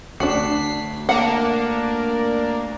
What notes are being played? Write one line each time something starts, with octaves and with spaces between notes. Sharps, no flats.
D2 D4 F#4 B6 C7
A#3 D4 F#5